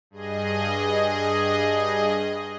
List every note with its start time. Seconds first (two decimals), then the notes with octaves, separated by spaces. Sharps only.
0.11 G2 G#4 D#5